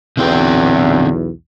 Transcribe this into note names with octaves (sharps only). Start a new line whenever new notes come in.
B1 E2 D3 C4 G5